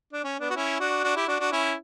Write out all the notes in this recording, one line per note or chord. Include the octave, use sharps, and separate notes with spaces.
D4
C#4
B3 D4
F#4
C#4 E4
D4 F#4
D4 F#4
E4 G4
D4 F#4
D4 F#4
C#4 E4